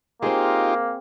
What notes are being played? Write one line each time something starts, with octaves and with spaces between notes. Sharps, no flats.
A#3 C4 D#4 F4 G4 G#4